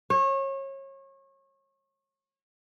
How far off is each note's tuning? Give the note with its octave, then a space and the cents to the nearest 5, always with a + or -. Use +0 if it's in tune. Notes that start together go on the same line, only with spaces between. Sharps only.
C#5 -30